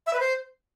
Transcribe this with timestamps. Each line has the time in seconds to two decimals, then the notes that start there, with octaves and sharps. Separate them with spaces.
0.06 E5
0.13 B4
0.20 C5